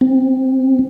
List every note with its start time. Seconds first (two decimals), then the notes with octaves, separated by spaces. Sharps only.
0.01 C4